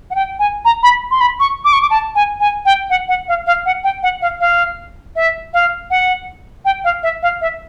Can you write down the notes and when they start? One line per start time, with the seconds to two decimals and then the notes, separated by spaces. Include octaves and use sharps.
0.11 F#5
0.15 G5
0.39 G#5
0.65 A#5
0.83 B5
1.11 C6
1.21 B5
1.40 C#6
1.65 D6
1.73 C#6
1.82 D6
1.90 A5
2.15 G#5
2.40 G#5
2.65 G5
2.90 F#5
3.08 F#5
3.28 F5
3.47 F5
3.66 F#5
3.84 G5
4.03 F#5
4.22 F5
4.40 F5
5.16 E5
5.54 F5
5.90 F#5
6.65 G5
6.84 F5
7.03 E5
7.23 F5
7.41 E5